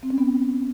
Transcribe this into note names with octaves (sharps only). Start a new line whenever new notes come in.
C4
C#4
B3